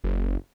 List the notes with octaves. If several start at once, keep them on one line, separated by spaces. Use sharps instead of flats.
F#1